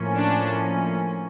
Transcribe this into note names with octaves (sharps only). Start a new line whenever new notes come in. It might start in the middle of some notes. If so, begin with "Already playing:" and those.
Already playing: A2 F3 A#3 C#4
D4